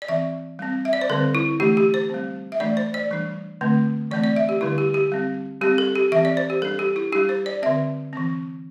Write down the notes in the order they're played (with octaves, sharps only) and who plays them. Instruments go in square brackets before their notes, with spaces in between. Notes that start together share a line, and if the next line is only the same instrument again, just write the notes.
[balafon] D5
E3 C4 E5
G3 C4
E5
D5
C5
D3 G3 C4 A4
E4
E3 A3 D4 G4
G4
C5
G3 C4
E5
E3 A3 D4 D5
C5
D5
E3 G3 D4
D3 A3 C4
E3 A3 C4 D5
D5
E5
G4
D3 G3 D4 E4
G4
G4
G3 C4
G3 C4 G4
A4
G4
E3 C4 E5
D5
C5
G4
G3 D4 A4
G4
E4
G3 D4 G4
C5
D5
D3 C4 E5
E3 C4